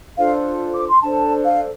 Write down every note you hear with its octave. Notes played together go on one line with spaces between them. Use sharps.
D4 F4 A4 C5 F5
D6
C6
D4 A4 C5 A5
F5